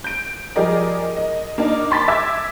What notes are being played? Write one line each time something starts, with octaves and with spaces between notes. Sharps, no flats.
G6 D7
F3 G3 G#4 A#4 D5 D#5
D#5
A#3 D4 D#4
A5 B5 C6 D6 A6 B6
E5 D6 E6 G#6